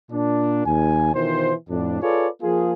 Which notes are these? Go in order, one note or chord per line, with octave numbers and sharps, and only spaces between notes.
A#2 D4
D#2 G#5
B2 D#3 E3 F4 C5
F2 A2 D4
F4 G#4 A4 B4 C#5 D5
F3 A#3 F4 G#4